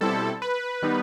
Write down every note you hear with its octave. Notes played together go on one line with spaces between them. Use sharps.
B2 G3 C4 E4 A4
B4
D#3 G3 B3 D#4